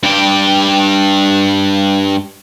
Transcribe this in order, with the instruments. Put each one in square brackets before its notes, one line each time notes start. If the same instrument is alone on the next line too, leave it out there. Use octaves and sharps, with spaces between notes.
[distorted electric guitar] G2 G4